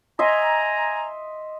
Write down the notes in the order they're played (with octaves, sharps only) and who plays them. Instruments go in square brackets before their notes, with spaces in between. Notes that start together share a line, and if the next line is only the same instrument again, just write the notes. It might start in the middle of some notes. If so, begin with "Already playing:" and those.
[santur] D#5 E5 C6 [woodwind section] G#5 A#5